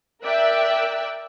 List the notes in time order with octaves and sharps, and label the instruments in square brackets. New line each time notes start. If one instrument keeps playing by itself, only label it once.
[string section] A#4 D5 E5 G5 E6 F#6